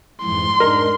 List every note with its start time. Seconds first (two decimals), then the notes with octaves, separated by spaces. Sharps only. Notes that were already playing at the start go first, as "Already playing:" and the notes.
0.23 F2 G#2 E3 C6
0.60 G#2 D4 D#4 A#4